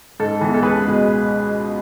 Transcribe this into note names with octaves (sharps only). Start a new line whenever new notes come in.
G#2 A4
E3 G#3 B3
A4
C#2 G#4 B4
B2 G#3